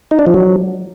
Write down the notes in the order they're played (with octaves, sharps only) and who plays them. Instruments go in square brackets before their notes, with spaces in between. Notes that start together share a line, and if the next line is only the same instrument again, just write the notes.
[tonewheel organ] D#4
D4
F3
F#3